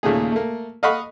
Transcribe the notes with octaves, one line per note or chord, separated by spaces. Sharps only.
D#2 A#2 C#3 A3 G#4
A3 A#3
D#5 F5 F#5 B5 C#6